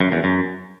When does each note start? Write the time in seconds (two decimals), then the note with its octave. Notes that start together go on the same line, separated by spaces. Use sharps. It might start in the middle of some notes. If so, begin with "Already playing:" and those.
0.01 F#2
0.12 E2
0.24 F#2